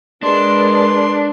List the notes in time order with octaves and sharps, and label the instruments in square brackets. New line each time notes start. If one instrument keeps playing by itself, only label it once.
[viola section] G#3 A#4 B4 [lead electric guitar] D4 [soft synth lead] C6